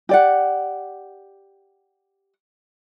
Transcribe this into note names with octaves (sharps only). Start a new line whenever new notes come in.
G4 D5 F#5